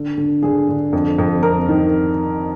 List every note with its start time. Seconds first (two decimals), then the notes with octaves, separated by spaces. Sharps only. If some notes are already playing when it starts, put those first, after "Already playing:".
Already playing: D3
0.18 D3
0.43 D3 G#4
0.69 D3
0.93 F2
1.18 F2
1.43 F2 A#4
1.69 D#3